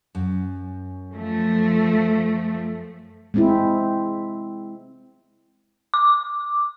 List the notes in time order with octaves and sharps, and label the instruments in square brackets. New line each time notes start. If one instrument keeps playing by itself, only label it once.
[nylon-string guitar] F#2
[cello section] F3 A3
[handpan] G#3 C4 E4
[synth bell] D6